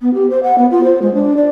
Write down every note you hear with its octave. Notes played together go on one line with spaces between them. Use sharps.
B3
G4
C5
F#5
B3
F4
C5
G#3
D4
D5